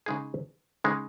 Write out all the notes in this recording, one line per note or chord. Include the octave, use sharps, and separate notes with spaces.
C#3 G#3 D#4 G#4
C#3 G#3 D#4 G#4